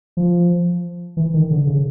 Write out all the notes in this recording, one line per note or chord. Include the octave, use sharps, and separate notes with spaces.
F3
E3
D#3
D3
C#3